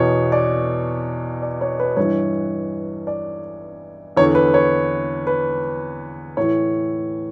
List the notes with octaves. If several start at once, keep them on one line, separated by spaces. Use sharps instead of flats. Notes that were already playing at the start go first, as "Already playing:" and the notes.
Already playing: E2 B2 C#5
D5
D5
C#5
B4
G2 E3 C#5
D5
E2 D3 C#5
B4
C#5
B4
A2 E3 C#5